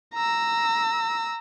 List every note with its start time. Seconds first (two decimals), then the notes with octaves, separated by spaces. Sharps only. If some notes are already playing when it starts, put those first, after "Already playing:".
0.14 A#5 E6